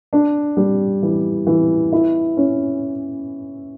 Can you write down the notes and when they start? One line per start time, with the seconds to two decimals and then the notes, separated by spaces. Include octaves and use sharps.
0.13 D4
0.57 G3
1.03 E3
1.47 E3
1.93 E4
2.37 C#4